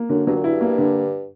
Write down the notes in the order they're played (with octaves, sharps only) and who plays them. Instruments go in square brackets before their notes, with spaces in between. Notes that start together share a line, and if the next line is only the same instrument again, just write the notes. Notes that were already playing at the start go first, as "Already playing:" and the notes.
Already playing: [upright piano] A#3
[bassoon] F#2 [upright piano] D3
[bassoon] G2 [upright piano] F#3
[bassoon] A#2
[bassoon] G2 [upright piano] E4
[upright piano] A#3
D3